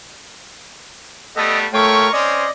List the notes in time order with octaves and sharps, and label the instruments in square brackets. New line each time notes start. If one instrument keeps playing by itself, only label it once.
[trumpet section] G3 A3 B3 [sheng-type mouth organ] A4 D#5
[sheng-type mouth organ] A3 C#5 G5 [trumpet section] F4 A#4 C#6
[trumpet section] C4 C#4 C5 [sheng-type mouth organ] D5 D#5